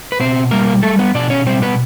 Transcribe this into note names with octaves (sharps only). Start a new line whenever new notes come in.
B4
B2 C4 C5
G3 A#3 A#4
G3 A3 A4
B3 B4
B2 D4 D5
C#4 C#5
G3 C4 C5
B3 B4